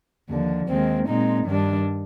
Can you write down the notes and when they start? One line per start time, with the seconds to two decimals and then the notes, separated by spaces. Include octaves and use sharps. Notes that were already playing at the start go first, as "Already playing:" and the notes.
0.29 D#2 D3 F3
0.68 D#2 D#3 G#3 C4
1.07 A#2 G#3 C4 D#4
1.46 G2 D#3 G3 D4